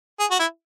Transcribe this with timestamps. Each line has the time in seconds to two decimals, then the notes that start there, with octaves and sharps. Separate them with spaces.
0.19 G#4
0.31 F#4
0.39 E4